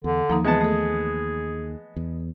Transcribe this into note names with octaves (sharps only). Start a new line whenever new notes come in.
E2 D3
D#2 F3 A#3 D#4
E3 G#3 B3 G#4 A5
A3 A4
E2